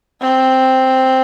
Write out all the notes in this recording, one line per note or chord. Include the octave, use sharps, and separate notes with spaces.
C4